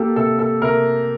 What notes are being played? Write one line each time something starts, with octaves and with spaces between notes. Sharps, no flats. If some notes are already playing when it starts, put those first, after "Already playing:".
Already playing: A#3 G4 A4
C3 A4
A4
C3 A#4